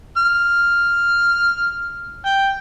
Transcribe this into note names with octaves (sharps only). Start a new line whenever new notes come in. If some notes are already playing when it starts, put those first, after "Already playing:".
F6
G5